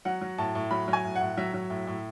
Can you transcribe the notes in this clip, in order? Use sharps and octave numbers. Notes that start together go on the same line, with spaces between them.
F#3 F#5
F#3
A2 A5
A2
F#3 B5
F#3
G#5
A2
F#5
A2
F#3 E5
F#3
A2
A2